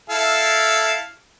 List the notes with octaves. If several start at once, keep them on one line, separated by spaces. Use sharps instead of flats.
E4 A4 F5